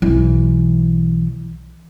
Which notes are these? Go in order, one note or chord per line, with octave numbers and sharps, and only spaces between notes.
B1 E3